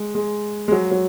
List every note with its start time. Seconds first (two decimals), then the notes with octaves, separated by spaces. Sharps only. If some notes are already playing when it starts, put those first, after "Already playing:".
Already playing: G#3
0.15 G#3
0.68 G#3
0.72 F#3
0.91 F#3